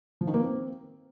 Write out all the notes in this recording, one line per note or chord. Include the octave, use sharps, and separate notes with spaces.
F3
D#3
A#3
C4